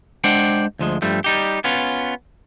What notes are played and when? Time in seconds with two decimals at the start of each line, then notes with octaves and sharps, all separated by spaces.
0.24 G#3 D4 C5 D5 F#5 G5
0.79 D2 F3 G#3
1.02 G2 F3 G3 A3
1.24 G3 D#4 G4
1.64 B3 C#4 F4